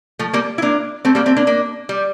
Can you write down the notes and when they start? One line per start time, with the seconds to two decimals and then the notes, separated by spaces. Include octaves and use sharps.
0.19 F3 A3
0.33 G3 A#3
0.58 E4
0.62 A#3 D4
1.05 A3 C4
1.15 G3 A#3
1.26 A3 C4
1.37 A#3 D4
1.47 A#3 D4
1.89 G3